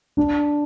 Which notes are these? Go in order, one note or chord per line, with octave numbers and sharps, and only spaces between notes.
D4